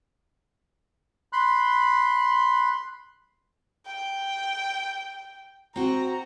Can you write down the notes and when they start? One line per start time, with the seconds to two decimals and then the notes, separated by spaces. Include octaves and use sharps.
1.33 B5 C6 F#6
3.86 G5
5.76 C4 F#4 A#5